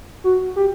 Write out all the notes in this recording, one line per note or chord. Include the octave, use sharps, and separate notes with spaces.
F#4
G4